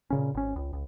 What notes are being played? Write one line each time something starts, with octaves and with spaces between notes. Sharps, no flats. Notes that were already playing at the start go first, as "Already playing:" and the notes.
A#2 C#3 C#4
G#1 C#4
C#2
C#2